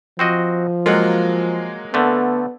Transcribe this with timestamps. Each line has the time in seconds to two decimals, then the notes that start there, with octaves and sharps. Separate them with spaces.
0.19 F3 C4 F#4 D#5
0.86 F#3 G#3 A#3 F4 F#5
1.94 D3 A3 B3